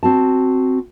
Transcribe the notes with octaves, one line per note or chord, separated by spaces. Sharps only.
C4 F#4 A5